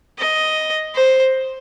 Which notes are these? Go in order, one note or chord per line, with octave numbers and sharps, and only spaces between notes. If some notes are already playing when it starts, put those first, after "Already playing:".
D#5
C5